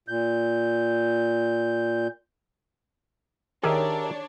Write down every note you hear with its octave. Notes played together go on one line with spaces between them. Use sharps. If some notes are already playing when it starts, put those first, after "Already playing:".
A#2 G6
D#3 D4 G4 G#4 A#4 C#5 E5